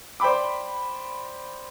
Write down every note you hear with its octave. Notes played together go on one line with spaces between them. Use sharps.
C5 D5 G5 B5 D6